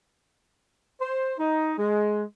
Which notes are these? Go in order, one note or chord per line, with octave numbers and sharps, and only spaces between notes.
C5
D#4
G#3